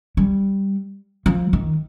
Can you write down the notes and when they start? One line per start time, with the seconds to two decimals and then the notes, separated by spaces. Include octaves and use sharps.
0.17 G3
1.26 F3
1.53 D#3